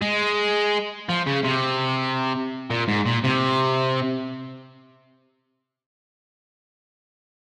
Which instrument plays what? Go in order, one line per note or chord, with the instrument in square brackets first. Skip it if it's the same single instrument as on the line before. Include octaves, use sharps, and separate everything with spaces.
[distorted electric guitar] G#3
F3
C#3
C3
A#2
G#2
A#2
C3